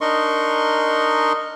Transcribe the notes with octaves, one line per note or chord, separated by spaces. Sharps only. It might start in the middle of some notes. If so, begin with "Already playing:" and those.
D4 D#4 A#4 D#5 C6 C#6